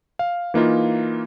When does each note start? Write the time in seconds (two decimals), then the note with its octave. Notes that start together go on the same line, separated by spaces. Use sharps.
0.19 F5
0.54 E3 A#3 D#4 F4